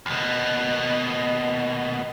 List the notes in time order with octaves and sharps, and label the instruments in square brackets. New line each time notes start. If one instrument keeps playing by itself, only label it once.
[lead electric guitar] D#2 B2